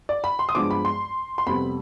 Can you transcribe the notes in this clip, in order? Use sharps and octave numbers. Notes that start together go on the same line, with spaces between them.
D5
B5
C6
D#6
G2 F3 G#3 B3 D6
B5
C6
C6
F2 C3 G3 B3 B5